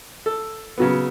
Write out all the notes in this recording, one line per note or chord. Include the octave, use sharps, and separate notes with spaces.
A4
C#3 F#3 B3